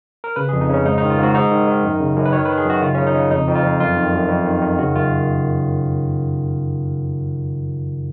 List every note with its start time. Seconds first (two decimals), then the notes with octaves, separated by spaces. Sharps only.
0.24 A#4
0.36 C#3 B4
0.49 G#4
0.53 F2
0.61 D#4
0.69 C#3 C#4
0.85 G#2 D#4
0.98 D#4
1.02 D#3
1.10 F4
1.18 G#2 F#4
1.34 G#2 D#4
1.51 D#3
1.67 D#3
1.84 F#2
2.00 C#3
2.16 F#2
2.25 B4
2.33 D#3 C#5
2.45 B4
2.49 D#3
2.58 G#4
2.65 F#2 F#4
2.82 C#3 F4
2.95 C#3 C#4
3.07 D#4
3.15 C#3
3.31 F2 D#4
3.47 F2
3.55 F4
3.64 F2
3.80 F#2 F4
3.96 D#3
4.14 F#2
4.29 F2
4.46 D#3
4.62 D#3
4.78 C#3 F#4
4.95 F#2 F4